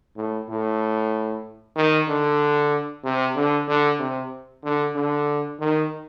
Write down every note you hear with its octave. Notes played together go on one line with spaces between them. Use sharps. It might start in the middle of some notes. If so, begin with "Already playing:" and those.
A2
A2
D#3
D3
C3
D3
D3
C3
D3
D3
D#3